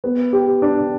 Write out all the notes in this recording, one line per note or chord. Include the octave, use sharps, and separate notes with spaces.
B3
G4
D4